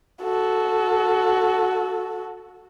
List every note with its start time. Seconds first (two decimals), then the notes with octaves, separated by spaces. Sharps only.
0.23 F#4 A4